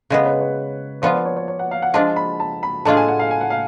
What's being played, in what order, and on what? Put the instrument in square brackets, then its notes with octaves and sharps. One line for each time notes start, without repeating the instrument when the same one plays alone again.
[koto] C#3 G#3 B3 [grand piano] C#5
[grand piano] B4
C#5
[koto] F3 B3 F4 [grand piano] D5
[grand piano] D5
C#5
C#5
C#5
F#5
F5
F#5
[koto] F3 G#3 D4 F4 [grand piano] A5
[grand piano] B5
A5
B5
[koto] A2 G#3 D4 F4 G#4 [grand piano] A5
[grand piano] G#5
F#5
F5
G#5
F#5
F5